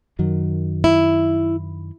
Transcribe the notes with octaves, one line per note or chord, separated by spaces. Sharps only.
F#2 D#3 F#3
E4